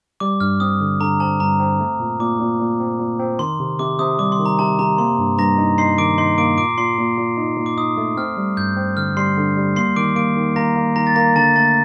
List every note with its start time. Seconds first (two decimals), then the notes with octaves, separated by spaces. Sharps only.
0.20 G3 D6
0.40 G2 F6
0.60 C4 D#6
0.81 D3
1.01 D3 A#5
1.20 C4 A5
1.40 G2 A#5
1.60 C4
1.80 A3
2.00 A#2
2.20 A#2 D6
2.40 A#2
2.60 A#2
2.80 C4
2.99 A#2
3.19 C4
3.39 D#3 C6
3.60 C3
3.79 C3 D6
3.99 C3 D#6
4.19 G3 D6
4.32 C6
4.39 D#3
4.46 A#5
4.59 C3 A5
4.79 C3 A#5
4.98 A#3 C6
5.19 G2
5.38 G2 A#5 A#6
5.58 D#4
5.78 D#4 C6 C7
5.98 D#3 D6 D7
6.18 D#4 C6 C7
6.38 A#3 D6 D7
6.58 A#2 D6 D7
6.78 A#2 C6 C7
6.98 A#2
7.18 A#2
7.38 D#4
7.57 A#2
7.66 D6
7.77 D#4 D#6
7.97 A3
8.17 C4 F6
8.37 G3
8.57 G2 G6
8.77 C4
8.97 D3 F6
9.17 G3 C6 C7
9.37 D3
9.57 G3
9.76 A#3 C6 C7
9.96 D#3 D6 D7
10.16 A#3 D6 D7
10.37 D#3
10.56 A#3 A#5 A#6
10.76 A#3
10.96 D#3 A#5 A#6
11.07 A6
11.16 A#3 A#5 A#6
11.36 D3 A5 A6
11.56 A3 A5 A6